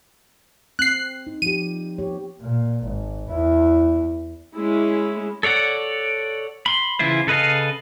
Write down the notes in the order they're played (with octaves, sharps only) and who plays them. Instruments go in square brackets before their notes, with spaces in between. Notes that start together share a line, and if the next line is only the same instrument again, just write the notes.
[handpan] C4 [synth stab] F#6 C7
[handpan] D#4
[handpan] F3 G4 [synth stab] D#7
[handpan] B3 G4 C#5
[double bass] A#2
G#1
E2 E4
[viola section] G#3 C#4 E4
[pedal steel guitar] A4 C#5 D5 F#5
B5 C6
C#3 E3 E4 F4 C5
C#3 A4 B4 D#5 F5